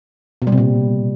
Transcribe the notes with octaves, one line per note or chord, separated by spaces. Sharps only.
B2
G3
C3
A#2